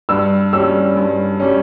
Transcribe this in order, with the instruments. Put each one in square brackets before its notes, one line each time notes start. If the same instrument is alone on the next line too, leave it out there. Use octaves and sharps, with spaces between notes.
[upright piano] G2 E6
G3 C#4 E6
G2
G3 C#4